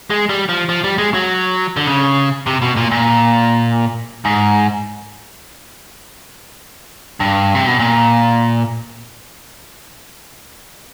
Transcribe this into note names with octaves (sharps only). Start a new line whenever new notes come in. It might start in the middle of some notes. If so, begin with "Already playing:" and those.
G#3
G3
F3
F3
G3
G#3
F#3
D3
C#3
C3
B2
A#2
A#2
G#2
G2
C3
B2
A#2